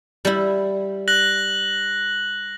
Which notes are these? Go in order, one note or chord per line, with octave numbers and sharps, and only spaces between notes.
G3 E4
F#6 A#6 F#7